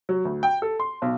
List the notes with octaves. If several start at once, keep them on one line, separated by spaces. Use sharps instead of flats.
F#3
D2
G5
A4
C6
B1